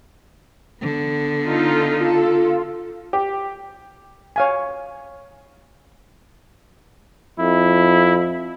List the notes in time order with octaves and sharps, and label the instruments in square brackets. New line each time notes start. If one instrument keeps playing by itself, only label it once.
[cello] D3 B3
[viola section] D#4 F4 A4
[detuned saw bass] F4 [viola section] A4
[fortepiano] G4
[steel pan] C#5 F5 G#5
[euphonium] F2 [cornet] E4